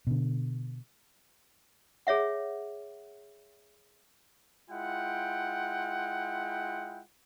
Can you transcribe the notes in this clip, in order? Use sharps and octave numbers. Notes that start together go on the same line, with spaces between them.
B2 D3
G#4 C#5 E5 F#5
G#3 E4 F4 F#5 G5